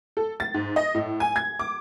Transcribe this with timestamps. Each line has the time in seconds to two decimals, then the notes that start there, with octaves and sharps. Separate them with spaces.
0.17 A4
0.40 A6
0.54 G#2
0.76 D#5
0.94 A2
1.20 G#5
1.36 G#6
1.59 D6